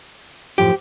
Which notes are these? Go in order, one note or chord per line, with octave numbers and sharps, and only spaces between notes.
F#2 A2 F3 G4